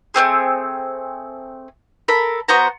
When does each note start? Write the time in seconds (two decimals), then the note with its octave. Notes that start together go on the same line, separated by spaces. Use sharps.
0.14 A3 A#3 C4 G#4
2.08 A4 A#4 B5
2.48 B3 F#4 C5 A#5